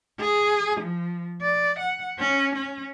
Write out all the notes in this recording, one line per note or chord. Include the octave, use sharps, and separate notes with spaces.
G#4
F3
D5
F#5
C#4
C#4